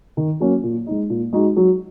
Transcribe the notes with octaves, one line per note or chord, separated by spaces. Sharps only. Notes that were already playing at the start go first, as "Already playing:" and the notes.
D#3
F#3 A#3 C#4
A#2
G#3 D#4
A#2
G#3 D#4 F#4
F#3